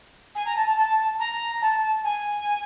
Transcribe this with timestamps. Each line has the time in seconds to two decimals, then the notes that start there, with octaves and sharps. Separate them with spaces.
0.35 G#5
0.45 A#5
0.56 A5
0.66 A5
0.77 A5
1.19 A#5
1.61 A5
2.04 G#5